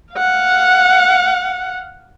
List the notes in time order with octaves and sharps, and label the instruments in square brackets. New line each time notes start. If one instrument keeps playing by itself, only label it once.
[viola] F5 F#5